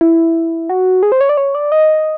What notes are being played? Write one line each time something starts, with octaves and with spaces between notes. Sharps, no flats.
E4
F#4
G#4
C5
C#5
D5
C#5
D5
D#5